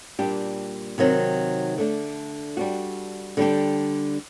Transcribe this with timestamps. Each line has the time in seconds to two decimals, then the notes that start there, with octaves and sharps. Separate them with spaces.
0.19 A#2 G3 D4 G4
0.98 C3 D#3 F#3 C4
1.78 D3 A3 D4
2.57 G3 D4 F#4
3.37 D3 G3 D4 G4